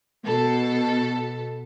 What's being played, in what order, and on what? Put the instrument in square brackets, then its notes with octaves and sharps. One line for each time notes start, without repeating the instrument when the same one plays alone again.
[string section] B2 A4